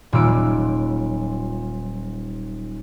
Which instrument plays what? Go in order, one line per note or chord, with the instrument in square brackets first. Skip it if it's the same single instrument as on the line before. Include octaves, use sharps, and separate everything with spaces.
[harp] D#1 F#3 F4 E6 D7